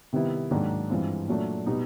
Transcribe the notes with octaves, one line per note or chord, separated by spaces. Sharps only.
C3 D#3 G3 B3 E4
G#2 D#3 F#3 A#3 D4
G2 E3 G#3 C4 F4
A#2 F#3 A3 D4
B2 G3 B3 D#4